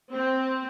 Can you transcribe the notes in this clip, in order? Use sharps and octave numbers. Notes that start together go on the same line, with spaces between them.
C4